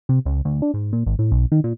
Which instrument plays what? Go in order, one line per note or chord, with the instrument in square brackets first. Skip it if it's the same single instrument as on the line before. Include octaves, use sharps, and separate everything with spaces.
[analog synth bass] C3
C#2
D2
D4
G#2
A#2
G#1
A2
B1
D#3
A#2